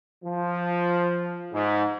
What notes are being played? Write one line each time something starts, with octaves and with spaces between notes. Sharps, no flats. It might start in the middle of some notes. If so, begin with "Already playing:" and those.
F3
G#2